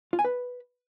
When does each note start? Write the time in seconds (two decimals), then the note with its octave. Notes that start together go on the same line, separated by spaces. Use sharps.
0.13 F4
0.19 G#5
0.25 B4